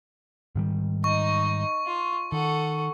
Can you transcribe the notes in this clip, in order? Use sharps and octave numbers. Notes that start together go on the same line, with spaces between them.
G#2 D#3 G3
D#4 D#5 C#6
F4
D#3 A4 F#5